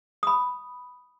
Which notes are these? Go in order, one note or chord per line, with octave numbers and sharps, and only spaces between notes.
B5 D#6